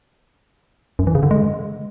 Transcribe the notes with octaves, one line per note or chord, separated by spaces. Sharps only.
F#2
E3
C#3
D3
G#3